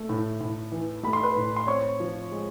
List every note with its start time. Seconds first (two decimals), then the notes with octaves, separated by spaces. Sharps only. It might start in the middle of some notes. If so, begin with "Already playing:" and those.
Already playing: A3
0.09 A2
0.41 A2
0.72 E3
1.03 A3 B5
1.13 C6
1.23 B4 B5
1.36 A2
1.56 C6
1.67 C4 C#5 C#6
2.00 F3
2.32 G#3